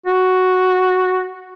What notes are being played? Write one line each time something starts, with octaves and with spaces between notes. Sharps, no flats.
F#4